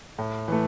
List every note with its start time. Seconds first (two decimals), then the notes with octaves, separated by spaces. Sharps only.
0.18 A2
0.48 E3 A3